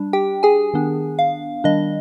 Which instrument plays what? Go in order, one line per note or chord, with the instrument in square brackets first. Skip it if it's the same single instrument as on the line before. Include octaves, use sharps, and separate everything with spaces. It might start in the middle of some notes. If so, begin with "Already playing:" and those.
Already playing: [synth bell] G3 D4
G4 G5
G#4 G#5
D#3 B3 D4
F5
D#3 G3 D4 D#5